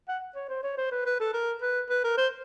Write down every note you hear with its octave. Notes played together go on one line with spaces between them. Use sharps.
F#5
C#5
C5
C#5
C5
B4
B4
A4
A#4
B4
B4
A#4
C5